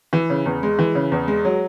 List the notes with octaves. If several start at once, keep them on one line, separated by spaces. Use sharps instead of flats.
E3
C#3
E2
G#3
E3
C#3
E2
G#3
F#3